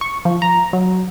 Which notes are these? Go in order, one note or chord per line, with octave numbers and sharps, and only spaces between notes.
C#6
F3
A#5
F#3